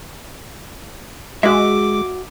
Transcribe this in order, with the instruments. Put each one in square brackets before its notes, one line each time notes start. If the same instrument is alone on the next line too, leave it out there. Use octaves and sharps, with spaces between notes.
[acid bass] G#3 [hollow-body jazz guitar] F#4 E5 [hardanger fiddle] D6